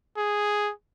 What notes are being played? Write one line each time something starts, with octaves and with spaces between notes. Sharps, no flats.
G#4